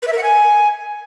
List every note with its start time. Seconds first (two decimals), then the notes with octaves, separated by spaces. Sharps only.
0.02 B4
0.07 E5
0.12 A#4
0.17 F#5
0.23 G#5